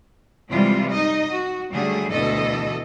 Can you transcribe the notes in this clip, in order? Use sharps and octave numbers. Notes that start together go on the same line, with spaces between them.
C3 E3 G3 G#3 F4
D#4 D#5
F#4
D3 F#3 G3 A3 G#4
D2 B2 E3 A3 A4 D#5